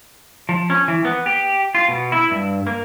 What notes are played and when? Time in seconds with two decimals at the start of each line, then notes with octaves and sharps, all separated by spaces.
0.49 F3
0.70 C#4
0.88 E3
1.05 B3
1.26 G4
1.75 F4
1.89 B2
2.12 E4
2.31 G2
2.67 A#3